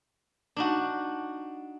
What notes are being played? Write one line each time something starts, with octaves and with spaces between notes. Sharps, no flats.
D4 D#4 F#4